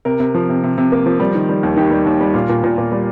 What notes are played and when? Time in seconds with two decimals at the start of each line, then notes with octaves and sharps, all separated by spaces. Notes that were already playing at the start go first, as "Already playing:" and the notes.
0.05 C3 A#4
0.20 C3
0.34 F3
0.49 C3
0.63 C3
0.78 C3
0.92 A#3
1.06 F3
1.20 G3
1.35 D#3
1.49 G3
1.63 D#2
1.77 D#3 G4
1.91 G3
2.06 D#2
2.21 G3
2.34 A#2 F4
2.49 A#2
2.64 A#2
2.78 A#2
2.92 G3